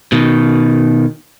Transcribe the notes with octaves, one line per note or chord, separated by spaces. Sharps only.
B2 D#3